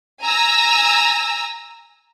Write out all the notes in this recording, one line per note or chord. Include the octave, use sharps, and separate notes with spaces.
G#5 A#5 E6